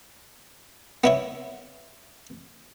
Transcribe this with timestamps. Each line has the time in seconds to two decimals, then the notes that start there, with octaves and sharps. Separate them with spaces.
1.04 B3 E4 C#5